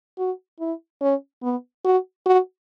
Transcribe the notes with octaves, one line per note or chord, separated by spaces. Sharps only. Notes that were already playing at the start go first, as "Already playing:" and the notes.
F#4
E4
C#4
B3
F#4
F#4